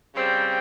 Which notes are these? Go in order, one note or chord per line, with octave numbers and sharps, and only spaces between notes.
C#3 G3 C4